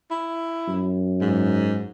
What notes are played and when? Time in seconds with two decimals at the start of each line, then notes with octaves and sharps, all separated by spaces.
0.11 E4
0.68 F#2
1.21 G#2